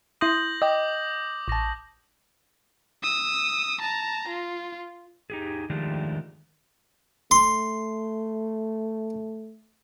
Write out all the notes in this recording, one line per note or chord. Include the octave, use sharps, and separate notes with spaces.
E4 C6 D#6 G6 A#6 F#7
D#5 G5 D6 D#6 A#6
A1 A5 C#6 A#6
D#6 E6
A5 A#5
F4
D#4 G4 G#4
D#3 F3 G#3 A3 D4 G4
A3 C6